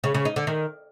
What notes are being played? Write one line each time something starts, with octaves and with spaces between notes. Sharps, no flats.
C#3
C#3
D#4
D3
D#3